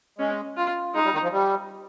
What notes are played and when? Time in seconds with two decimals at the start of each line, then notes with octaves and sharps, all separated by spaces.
0.18 G#3 C#4
0.57 F4
0.94 G#3 D#4
1.05 G3
1.13 D#3
1.23 F3
1.32 G3